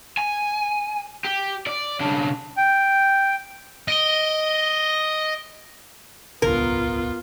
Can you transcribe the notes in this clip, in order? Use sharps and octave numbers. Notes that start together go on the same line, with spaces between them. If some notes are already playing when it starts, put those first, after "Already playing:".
G#5
G4
D5
C#3 D4
G5
D#5 A#6 D7 G7
D#1 G#1 C#2 B3 F4 A#4